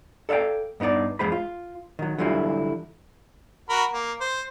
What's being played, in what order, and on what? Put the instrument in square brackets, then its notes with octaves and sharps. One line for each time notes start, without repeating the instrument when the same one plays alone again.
[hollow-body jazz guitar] A4 D5 E5 F5 G5
G2 B3 D#4 F4 D5
F2 G3 G#3 G#4 C5 B5
F4
D#3 F#3
D3 E3 F#3 G3 E4 F4
[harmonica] F#4 A#4 B5
A#3
C5